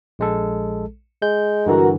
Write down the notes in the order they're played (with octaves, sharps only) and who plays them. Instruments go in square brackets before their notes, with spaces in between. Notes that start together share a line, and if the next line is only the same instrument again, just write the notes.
[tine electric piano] A#1 G#3 A4
[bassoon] G#3 [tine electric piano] G6
[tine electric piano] G2 D3 E3 [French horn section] F#4 A#4